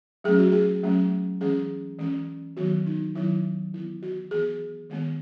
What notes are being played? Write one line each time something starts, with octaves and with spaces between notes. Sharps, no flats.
F#3 A3 C#4 G#4
F#4
G#4
F#3 A3 C#4
E3 G#3 C#4 G#4
E3 G#3 C#4
D#3 F#3 B3 F#4
D#4
D#3 F#3 B3 E4
E3 B3 E4
F#4
E3 B3 G#4
D#3 G#3 B3